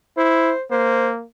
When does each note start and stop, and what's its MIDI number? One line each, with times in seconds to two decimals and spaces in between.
0.17 0.52 64
0.17 0.63 72
0.71 1.24 58
0.71 1.10 72